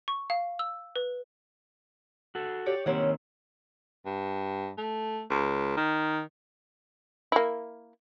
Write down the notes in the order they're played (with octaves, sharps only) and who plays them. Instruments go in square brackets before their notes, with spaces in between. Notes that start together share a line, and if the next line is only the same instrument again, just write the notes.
[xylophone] C#6
F5
E6
B4
[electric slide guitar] F#4 A4
[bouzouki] G4 C#5 D5
[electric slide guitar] D#3 A#3 C4 [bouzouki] C#4 F#5
[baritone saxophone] G2
A3
C#2
D#3
[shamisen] A#3 E4